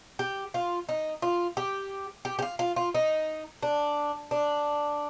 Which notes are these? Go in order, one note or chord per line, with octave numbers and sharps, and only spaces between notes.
G4
F4
D#4
F4
G4
G4
G4
F4
F4
F4
D#4
D4
D4